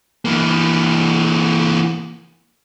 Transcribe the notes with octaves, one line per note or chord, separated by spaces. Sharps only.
E3 A#3